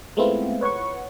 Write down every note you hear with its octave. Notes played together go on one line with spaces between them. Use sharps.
G#3 A3 B3 C4 E4 F4
B4 C#5 F#5 C#6